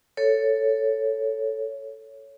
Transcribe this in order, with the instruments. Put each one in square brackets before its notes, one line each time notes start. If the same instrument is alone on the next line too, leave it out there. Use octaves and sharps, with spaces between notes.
[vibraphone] A4 C#5